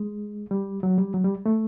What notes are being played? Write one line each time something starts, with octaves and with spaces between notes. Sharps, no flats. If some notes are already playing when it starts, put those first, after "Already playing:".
Already playing: G#3
G3
F#3
G3
F#3
G3
A3